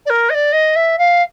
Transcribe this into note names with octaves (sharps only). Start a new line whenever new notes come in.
D5
A#4
D#5
D5
D#5
E5
F5